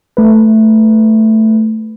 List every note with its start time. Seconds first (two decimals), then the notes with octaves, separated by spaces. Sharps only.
0.17 A3 B4